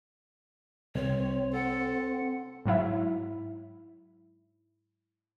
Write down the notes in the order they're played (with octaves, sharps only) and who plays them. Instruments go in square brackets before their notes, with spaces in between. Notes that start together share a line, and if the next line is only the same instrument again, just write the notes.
[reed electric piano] C2 [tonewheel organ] C4 [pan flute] C#5
[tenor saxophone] A4 [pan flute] F#5
[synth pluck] G#2 F#3 E4 E5